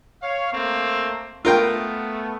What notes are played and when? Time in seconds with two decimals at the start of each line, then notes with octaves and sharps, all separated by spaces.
0.22 C#5 F5
0.53 A3 A#3 C4
1.45 A3 B3 F4 A#4 G5